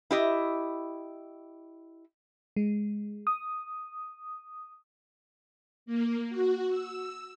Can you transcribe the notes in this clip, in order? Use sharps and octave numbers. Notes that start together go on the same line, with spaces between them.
E4 G4 D#5
G#3
D#6
A#3
F#4
E6